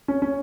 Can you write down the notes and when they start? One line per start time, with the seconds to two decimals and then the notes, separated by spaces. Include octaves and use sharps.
0.08 C#4
0.22 C#4